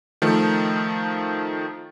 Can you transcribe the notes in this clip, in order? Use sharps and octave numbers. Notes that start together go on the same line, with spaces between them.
D#3 F3 A3